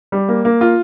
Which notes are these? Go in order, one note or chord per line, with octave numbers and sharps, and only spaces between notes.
G3
A#3
A#3
F4